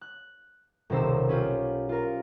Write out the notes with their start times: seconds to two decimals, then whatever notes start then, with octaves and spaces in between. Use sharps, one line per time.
0.01 F#6
0.90 D#1 B1 C3 C5 E6
1.29 C#4 E4 F4 G4
1.89 F4 A#4